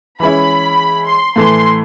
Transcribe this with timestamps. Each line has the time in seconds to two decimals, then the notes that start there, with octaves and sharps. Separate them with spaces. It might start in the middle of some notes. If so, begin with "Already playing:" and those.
0.20 E3 G#3 C#4 E4 B5
1.07 C6
1.35 A2 E3 A3 C6